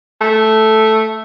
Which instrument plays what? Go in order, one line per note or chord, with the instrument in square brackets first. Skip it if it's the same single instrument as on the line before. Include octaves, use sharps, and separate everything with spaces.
[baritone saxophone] A3